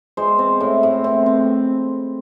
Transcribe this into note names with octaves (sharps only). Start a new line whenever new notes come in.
G#3 C5
C4
A2
A2
C4
C4